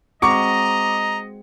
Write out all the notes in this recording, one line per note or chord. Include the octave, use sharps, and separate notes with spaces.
G#3 C4 F#4 D#5 A#5 C#6 D6 C#7